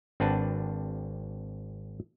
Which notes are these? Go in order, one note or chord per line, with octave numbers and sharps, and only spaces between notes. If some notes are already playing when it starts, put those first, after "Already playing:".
G#1 C4 D4 B4 F#5 A5